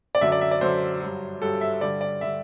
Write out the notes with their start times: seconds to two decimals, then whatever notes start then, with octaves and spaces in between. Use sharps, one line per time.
0.15 D5
0.21 F#2 D3 F#3 E5
0.32 D5
0.41 E5
0.51 D5
0.61 F#2 D3 F#3 C5
1.01 G2 F#3
1.41 G2 F#3 A4
1.61 E5
1.81 G2 D3 G3 D5
2.01 D5
2.21 D3 G3 E5